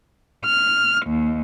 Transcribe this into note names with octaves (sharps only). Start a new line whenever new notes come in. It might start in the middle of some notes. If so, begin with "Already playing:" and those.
F6
D#2